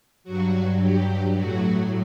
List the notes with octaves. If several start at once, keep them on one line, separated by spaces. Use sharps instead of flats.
G2 F#3 F#4
G4
A2 F#3 F#4